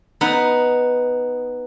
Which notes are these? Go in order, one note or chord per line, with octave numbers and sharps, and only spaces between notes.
B3 D#4 F#5